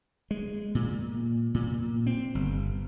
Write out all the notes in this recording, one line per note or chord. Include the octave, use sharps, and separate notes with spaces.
G#3
A#2
A#2
C4
G1